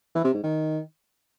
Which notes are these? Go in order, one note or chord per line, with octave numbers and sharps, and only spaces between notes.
E3
C3
G#2
D#3